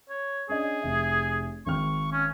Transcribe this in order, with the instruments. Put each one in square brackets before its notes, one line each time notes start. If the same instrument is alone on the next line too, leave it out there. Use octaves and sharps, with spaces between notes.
[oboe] C#5
[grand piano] C#4 D4 D#5 [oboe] G#4
[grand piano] F1 E5
[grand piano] G#1 G5 F6 [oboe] C#6
[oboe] C#4